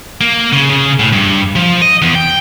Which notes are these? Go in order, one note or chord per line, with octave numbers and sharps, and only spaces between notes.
A#3
C#3
C#3
A2
G2
F3
D#5
E2
G5